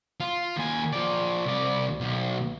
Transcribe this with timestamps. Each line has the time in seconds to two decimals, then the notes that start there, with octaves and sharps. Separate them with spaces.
0.20 F4
0.57 D#2 G#5
0.93 F3 D5
1.45 C2 D5
2.00 B1